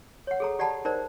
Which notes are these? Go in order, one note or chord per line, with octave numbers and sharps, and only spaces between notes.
C#5 F#5
G#4 A4 A#5
G4 D5 F#5 A5 B5
D#4 A#4 C5 D5